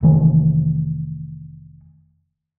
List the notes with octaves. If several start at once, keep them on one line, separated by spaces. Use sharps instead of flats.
F1 D#3 E3 A3